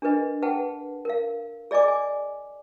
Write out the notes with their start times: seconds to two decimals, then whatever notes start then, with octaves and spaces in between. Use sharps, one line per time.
0.02 D4 G#4 A#4 B4 D#5
0.42 G#4 B4 F#5 G5 A5
1.05 A#4 F5
1.71 G#4 D5 D#5 G#5 D6
1.88 G#5